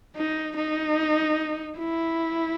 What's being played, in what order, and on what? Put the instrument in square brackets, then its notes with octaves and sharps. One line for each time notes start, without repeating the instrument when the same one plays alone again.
[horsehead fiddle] D#4
D#4
E4